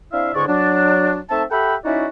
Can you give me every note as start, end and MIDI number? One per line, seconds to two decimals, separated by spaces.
0.13 0.31 60
0.13 0.31 62
0.13 0.31 64
0.13 0.31 76
0.13 0.31 77
0.35 0.47 37
0.35 0.47 44
0.35 0.47 50
0.35 0.47 56
0.35 0.47 74
0.35 0.47 85
0.48 1.19 54
0.48 1.19 62
1.30 1.44 57
1.30 1.44 60
1.30 1.44 63
1.30 1.44 76
1.30 1.44 81
1.51 1.75 67
1.51 1.75 69
1.51 1.75 76
1.51 1.75 78
1.51 1.75 79
1.51 1.75 83
1.85 2.07 61
1.85 2.07 63
1.85 2.07 64
1.85 2.07 66
1.85 2.07 74
1.85 2.07 76